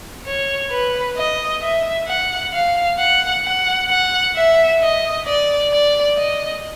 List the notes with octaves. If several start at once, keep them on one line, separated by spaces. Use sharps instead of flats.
C#5
B4
D#5
E5
F#5
F5
F#5
F#5
F#5
E5
D#5
D5
D5
D#5